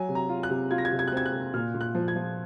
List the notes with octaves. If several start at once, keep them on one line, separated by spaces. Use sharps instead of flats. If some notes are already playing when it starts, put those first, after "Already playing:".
Already playing: F#3 G#5
C3
A#5
F4
F#6
C3
F4 G#6
A#6
G#6
C3
G#6
F#6
C4 G#6
F#6
C3
A#2 F6
A#2
F#6
F3
G#6
F3